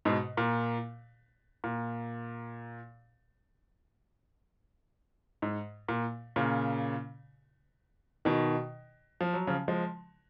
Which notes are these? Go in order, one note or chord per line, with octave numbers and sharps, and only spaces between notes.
G#2 B2
A#2
A#2
G#2
A#2
A#2 C#3
B2 D#3
F3
F#3
C#3 F3
F3 G#3